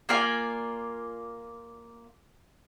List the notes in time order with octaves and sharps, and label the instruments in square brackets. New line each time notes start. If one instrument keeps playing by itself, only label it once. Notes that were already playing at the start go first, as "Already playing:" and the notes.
[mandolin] A#3 F4 D5 G#5